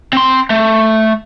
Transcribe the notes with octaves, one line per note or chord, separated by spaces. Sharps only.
C4 C6
A3